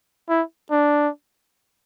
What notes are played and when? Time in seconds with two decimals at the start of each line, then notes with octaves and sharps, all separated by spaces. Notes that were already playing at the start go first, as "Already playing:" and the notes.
0.29 E4
0.71 D4